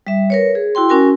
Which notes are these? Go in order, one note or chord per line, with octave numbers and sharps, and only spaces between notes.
G3 E5
A#4 B4 C#5
G#4
E4 F#4 G5 C6
C#4 F#4 A#4 G#5